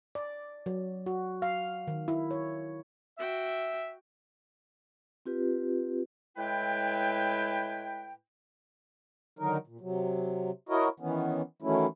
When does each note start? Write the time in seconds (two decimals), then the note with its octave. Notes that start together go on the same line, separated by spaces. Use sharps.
0.15 D5
0.66 F#3
1.06 F#4
1.42 F5
1.87 D#3
2.08 E4
2.31 C#5
3.18 F#4 E5 G5
5.26 C4 F4 G4 B4
6.37 A2 G#3 E4 B4 G5
9.39 D3 D#3 F#3 D#4 A#4
9.67 A#2
9.81 C3 F#3
10.69 E4 F#4 A#4 C#5 D#5
11.00 D#3 E3 B3 C#4
11.62 D#3 E3 F#3 A3 C#4 E4